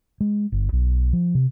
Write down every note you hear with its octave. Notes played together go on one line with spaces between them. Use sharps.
G#3
G1
B1
F3
C3